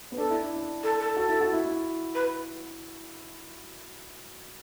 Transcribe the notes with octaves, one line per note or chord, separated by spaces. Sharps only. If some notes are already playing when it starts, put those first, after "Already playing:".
B3
D4 A4
E4
D4
D4
A4
A4
F#4 A4
E4
F#4
E4
E4
B4